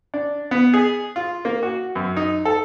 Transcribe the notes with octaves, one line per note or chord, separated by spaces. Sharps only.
D4
B3
G#4
F4
A#3
F#4
F#2
D#4
A4